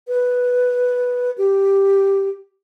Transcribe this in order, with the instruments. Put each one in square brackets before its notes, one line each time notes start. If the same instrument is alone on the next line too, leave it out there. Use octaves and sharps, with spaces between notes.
[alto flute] B4
G4